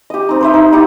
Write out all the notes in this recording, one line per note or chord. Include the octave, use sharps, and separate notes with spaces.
G4 D#5
C4 D#4
B4 C5 E5
D#4
B3 D#4 E4 G4